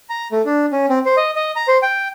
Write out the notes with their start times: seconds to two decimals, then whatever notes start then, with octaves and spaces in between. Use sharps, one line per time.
0.10 A#5
0.32 A3
0.46 D4
0.72 C#4
0.89 C4
1.05 C5
1.17 D#5
1.35 D#5
1.56 A#5
1.68 C5
1.82 G5